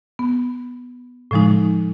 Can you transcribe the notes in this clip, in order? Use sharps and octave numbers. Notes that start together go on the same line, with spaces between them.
B3
A2 C#3 F3 G#3 D#4